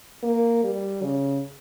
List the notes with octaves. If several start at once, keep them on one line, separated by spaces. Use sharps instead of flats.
A#3
G3
C#3